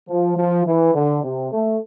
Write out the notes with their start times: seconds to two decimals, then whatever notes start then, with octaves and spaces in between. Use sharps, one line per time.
0.08 F3
0.36 F3
0.66 E3
0.94 D3
1.23 C3
1.52 A3